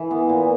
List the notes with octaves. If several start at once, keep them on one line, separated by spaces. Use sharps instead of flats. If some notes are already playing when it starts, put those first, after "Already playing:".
Already playing: E3
B3
A#2